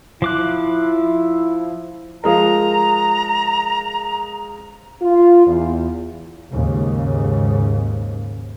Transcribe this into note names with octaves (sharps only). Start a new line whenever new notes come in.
F3 E4 D6 F#6
F3 G#3 A#4 A#5
F4
E2
D#2 G#2 C#3